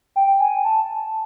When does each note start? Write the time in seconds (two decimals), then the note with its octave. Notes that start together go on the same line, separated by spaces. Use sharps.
0.16 G5
0.40 G#5
0.64 A5